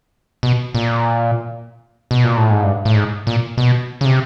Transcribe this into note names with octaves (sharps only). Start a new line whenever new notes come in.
B2
A#2
B2
A#2
A2
G#2
G2
A2
G#2
A#2
B2
C#3
C3